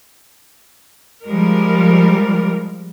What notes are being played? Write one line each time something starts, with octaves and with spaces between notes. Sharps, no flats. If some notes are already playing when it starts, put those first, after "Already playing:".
F3 G3 G#3 A#4